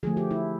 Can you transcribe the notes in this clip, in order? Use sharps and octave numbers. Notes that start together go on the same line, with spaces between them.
D3 F3 A3 G#4
G4
E4